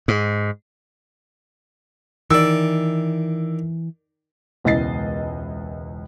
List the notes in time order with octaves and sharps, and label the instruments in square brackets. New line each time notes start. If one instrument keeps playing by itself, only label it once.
[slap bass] G#2
[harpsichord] D#3 D5 [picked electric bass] E3 [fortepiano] E6
[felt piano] E1 C#2 E4 D#5 A6 C7